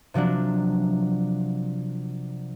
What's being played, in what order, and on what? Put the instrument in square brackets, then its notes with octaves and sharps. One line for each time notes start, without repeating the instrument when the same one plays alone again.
[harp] C3 F3 F#3 D4